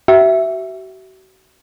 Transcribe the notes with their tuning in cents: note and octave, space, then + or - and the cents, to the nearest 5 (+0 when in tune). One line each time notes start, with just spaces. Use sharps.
F#4 +40 E5 +0